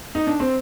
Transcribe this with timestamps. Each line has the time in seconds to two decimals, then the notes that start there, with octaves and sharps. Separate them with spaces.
0.15 D#4
0.27 D4
0.40 C4